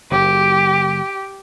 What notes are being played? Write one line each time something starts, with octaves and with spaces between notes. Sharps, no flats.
F#1 G4